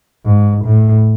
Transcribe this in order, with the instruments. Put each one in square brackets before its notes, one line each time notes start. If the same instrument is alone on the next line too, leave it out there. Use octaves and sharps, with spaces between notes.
[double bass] G#2
A2